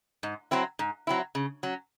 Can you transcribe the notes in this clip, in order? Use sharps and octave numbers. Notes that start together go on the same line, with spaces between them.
G#2
F#3 C4 E4
G#2
F#3 C4 E4
C#3
F#3 C#4